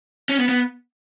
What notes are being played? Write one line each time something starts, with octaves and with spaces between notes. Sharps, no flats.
C#4
B3
B3